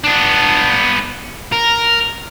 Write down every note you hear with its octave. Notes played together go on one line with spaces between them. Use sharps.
B3 D4
A#4